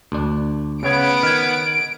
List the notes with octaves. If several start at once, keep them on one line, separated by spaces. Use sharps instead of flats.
D2 D4
C#3 B3 C#5 G#6 D7
D#3 F6 G#6